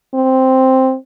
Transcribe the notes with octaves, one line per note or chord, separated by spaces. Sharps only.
C4